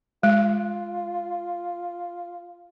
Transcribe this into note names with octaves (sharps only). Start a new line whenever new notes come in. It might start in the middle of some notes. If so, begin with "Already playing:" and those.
G#3 F4